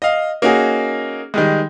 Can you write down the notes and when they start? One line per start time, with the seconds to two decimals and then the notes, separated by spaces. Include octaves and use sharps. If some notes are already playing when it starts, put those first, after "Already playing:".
0.02 D#5 F5
0.42 A#3 C#4 D#4 F#4 G#4
1.34 D#3 G3 G#3